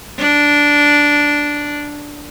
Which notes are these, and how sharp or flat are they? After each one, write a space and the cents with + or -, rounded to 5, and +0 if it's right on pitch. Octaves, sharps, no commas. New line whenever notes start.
D4 -5